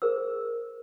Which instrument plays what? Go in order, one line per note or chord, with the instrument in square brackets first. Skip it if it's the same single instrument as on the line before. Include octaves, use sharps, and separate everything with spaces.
[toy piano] G#4 A#4 C5 E6